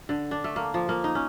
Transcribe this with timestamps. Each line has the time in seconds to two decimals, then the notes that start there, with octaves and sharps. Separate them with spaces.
0.09 D3
0.31 D4
0.44 A3
0.56 A#3
0.74 F3
0.89 A#3
1.04 D#4
1.15 C#4